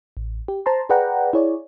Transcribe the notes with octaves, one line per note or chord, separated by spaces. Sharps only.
A1
G4
C5 A5 A#5 C6
G#4 B4 D5 F#5 G5 A#5
E4 G#4 C#5 D5